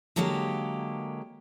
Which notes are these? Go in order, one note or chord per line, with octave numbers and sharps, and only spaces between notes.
D3 F#3 G#3 A#3 G4